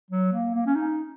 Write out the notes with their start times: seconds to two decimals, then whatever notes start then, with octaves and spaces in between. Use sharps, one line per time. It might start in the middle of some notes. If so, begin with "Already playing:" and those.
0.11 F#3
0.33 A#3
0.55 A#3
0.66 C#4
0.75 D#4